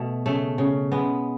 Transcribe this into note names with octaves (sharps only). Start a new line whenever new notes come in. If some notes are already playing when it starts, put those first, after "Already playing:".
Already playing: B2 A3
C#3 A3
C#3
G#3 B3